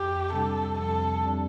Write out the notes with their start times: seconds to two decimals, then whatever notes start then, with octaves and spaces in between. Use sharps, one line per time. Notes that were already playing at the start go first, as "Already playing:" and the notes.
Already playing: F2 G4
0.32 C3 G3 D4 A4
0.79 F2 A4
1.25 C3 G3 D4